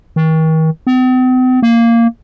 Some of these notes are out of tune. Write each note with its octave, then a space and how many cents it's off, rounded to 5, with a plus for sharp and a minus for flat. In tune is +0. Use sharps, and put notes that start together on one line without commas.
D#3 +40
C4 -45
A#3 -10